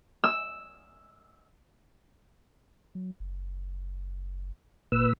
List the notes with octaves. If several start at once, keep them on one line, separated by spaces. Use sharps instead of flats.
E6
F#3
F#1
G1 A#2 B4 E6